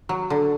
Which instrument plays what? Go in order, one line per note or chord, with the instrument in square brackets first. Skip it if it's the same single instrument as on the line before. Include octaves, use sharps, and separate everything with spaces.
[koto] F#3
D3